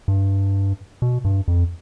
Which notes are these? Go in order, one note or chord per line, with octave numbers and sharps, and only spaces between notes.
G2
B2
G2
F2